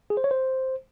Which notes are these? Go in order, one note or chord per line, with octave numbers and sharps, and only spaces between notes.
G#4
C5
C#5
C5